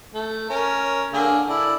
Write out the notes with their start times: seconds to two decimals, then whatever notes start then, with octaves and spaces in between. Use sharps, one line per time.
0.14 A3
0.50 C#4 A#4
1.13 D3 A#3 G#4
1.48 E4 A4 D5